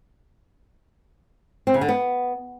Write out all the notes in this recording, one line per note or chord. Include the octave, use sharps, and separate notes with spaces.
C4
C#3
D3
B3